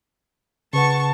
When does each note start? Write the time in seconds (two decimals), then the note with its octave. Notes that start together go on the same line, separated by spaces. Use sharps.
0.73 C#3 B4 F#5 A5 C#6